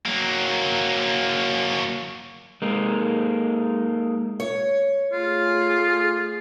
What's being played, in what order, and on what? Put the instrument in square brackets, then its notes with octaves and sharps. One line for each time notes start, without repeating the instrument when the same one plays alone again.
[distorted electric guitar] F#3 A#3
[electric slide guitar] G#3 A#3 D#4
[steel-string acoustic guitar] C#5
[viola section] A3 G#4 [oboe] F4